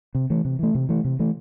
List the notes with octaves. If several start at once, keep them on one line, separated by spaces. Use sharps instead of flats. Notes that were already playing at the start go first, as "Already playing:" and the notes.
C3
E3 A3
C3
E3 A3
C3
E3 A3
C3
E3 A3